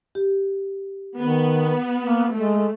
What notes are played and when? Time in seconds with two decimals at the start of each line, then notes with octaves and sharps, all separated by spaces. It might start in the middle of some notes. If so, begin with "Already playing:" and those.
0.15 G4
1.20 D#3 B3
2.02 A#3
2.34 G#3 A3